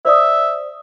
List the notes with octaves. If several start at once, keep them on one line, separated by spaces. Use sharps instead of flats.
C5 D5 E5 D#6